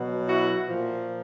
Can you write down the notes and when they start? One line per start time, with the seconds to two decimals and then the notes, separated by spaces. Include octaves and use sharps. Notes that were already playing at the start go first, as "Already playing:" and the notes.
Already playing: B2 F#3
0.26 E4 F#4
0.66 A#2 F3